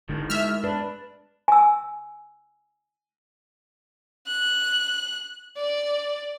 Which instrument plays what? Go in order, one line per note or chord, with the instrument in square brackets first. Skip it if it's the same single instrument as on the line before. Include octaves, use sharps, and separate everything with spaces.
[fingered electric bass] G#1 D3 [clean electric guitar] A2 D#3
[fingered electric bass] G#3 [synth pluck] E5 F6
[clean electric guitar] D4 [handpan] B4
[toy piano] G#5 E6
[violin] F#6
D5